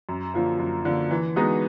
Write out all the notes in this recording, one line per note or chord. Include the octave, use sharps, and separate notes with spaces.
F#2
D3 F3 A#3
F#2
D3 F3 A#3
E3
G#3 B3 D#4 F#4